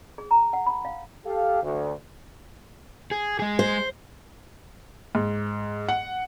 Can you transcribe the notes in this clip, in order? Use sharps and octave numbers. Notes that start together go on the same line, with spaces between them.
G#4
A#5
F#5
B5
F5
G4 A4 F5
D2
G#4
G#3 G#4
C5
G#2
F#5